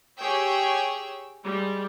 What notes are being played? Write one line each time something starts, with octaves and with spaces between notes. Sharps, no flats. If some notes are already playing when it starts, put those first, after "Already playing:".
G4 G#4 C#5 G5 E6
G3 G#3